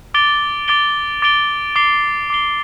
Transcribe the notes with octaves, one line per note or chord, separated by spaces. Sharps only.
D6 A6 D7 G7
D6 A6 D7 G7
D6 A6 D7 G7
D6 C7 G7
D6 C7 G7